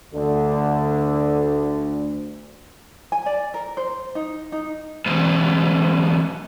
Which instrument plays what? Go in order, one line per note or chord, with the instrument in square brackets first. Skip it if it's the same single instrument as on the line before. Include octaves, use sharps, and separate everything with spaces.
[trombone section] D2 D3
[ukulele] G#5
D5
A#4
C5
D#4
D#4
[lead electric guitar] E2 G#2